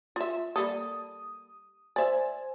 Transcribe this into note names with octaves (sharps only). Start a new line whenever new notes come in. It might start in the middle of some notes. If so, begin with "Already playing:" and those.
F4 E5
G3 A#3 A4 D#6
C5 D5 E5 G#5